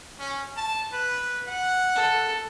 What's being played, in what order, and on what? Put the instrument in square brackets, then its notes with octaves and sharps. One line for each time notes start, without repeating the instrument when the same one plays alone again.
[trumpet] C#4
A5
B4
F#5
[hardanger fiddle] A4